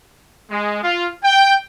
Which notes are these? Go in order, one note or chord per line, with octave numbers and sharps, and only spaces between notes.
G#3
F4
G5